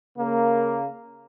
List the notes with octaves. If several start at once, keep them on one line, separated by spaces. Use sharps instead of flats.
C#3 A#3